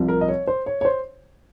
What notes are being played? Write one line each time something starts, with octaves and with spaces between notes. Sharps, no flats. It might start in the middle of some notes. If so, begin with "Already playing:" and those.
Already playing: C2 C3 F3
A#4
D#5
C#5
C5
C#5
C#5
C5